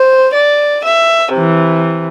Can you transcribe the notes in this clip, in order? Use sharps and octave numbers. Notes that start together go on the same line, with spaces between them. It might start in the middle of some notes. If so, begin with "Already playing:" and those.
Already playing: C5
D5
E5
C3 E3